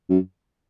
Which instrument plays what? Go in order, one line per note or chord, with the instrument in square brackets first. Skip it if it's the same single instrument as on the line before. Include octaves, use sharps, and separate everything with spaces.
[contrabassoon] F#2